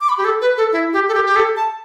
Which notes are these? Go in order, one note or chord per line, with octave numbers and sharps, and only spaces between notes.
D6
B5
G4
A4
B4
A4
E4
G4
A4
G4
G4
A4
A5